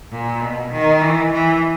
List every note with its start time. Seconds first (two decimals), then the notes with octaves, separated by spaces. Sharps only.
0.11 A#2
0.41 B2
0.72 D#3
1.01 E3
1.32 E3